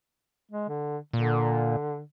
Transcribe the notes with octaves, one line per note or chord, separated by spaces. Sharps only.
G#3
D3
A#2 D3